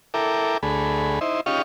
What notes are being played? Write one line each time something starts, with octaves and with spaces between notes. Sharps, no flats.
E4 A4 A#4 G5 D6
D2 A3 G#4 B5
D#4 E4 C5
C#4 D#4 F4 G4 F5 C#6